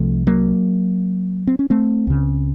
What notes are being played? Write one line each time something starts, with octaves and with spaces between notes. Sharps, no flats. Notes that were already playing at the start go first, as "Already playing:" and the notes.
Already playing: C2 C3 F3 A3
F#3 A#3
C4
C#4
A3 C4
C#2 C#3